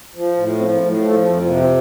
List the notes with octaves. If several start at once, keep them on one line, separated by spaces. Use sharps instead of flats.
F3
A2
F3 C4
A#3
A2
F#3
F3 A3
F2
C3 A#3
C4